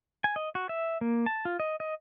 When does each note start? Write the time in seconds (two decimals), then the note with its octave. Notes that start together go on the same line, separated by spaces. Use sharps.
0.24 G#5
0.36 D#5
0.55 F#4
0.69 E5
1.01 A#3
1.26 A5
1.45 F4
1.60 D#5
1.80 D#5